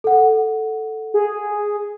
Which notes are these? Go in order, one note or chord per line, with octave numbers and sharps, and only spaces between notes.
A4 F#5
G#4